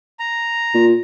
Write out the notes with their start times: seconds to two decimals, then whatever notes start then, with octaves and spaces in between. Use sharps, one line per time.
0.19 A#5
0.74 A#2